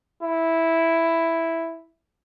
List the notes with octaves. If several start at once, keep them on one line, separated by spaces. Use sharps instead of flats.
E4